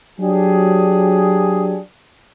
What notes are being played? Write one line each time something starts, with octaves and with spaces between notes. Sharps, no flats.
F#3 D4 G4 G#4